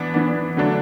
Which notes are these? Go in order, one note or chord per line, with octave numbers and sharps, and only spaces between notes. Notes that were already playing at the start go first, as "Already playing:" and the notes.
Already playing: E3 B3 D4
E3 B3 D4
D3 F#3 A3 D4